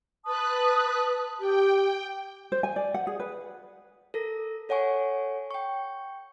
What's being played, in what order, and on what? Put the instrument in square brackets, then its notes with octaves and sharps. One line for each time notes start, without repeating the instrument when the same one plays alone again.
[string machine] B4 F#6 [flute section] A5 D#6
[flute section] G4 [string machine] G5
[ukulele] C5
G#5
D5
F#5
G#4
B4
[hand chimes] A4 A#4 A#6
A4 C#5 F#5 G#5 C#6
G5 C#6